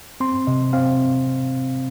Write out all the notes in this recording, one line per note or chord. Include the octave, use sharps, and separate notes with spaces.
C4 C6
C3 D#5
C4 F5